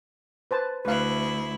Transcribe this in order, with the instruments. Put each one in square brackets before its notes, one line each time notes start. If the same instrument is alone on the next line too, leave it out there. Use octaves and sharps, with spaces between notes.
[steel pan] B4 C5 A5
[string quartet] D2 E4 [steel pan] B4 F5